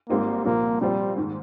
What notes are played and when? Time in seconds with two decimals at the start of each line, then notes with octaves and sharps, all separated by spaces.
0.09 G#1 G#2 G3 A#3 C4 D#4
0.45 C2 A#2 F3 A#3
0.81 A#2 F3 G3 C4 F4
1.17 G#2 D#3 G#3